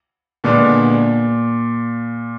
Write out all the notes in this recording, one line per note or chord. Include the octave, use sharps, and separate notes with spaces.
A#2 D3 G#3 B3 D4